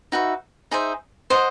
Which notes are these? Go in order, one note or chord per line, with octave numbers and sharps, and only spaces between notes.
D#4 F#4 B4 E5
D#4 G#4 C5 E5
C5 D#5 F#5